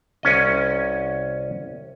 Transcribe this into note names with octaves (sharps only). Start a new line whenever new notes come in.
C2 C#4 D#5